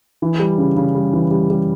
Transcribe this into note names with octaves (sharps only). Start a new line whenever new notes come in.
E3
G3
C#3
C#3
G3
E3
G3
G3